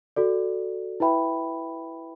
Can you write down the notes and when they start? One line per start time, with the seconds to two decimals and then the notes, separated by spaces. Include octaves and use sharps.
0.16 F#4 A4 D5
1.00 E4 B4 E5 G5 B5